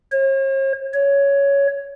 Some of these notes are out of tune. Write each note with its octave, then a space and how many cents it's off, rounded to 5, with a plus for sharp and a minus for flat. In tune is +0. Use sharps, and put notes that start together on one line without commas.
C#5 -45
C#5 +10